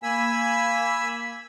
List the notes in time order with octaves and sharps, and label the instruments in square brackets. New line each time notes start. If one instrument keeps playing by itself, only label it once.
[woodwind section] A#3 [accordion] G#5 B5 E6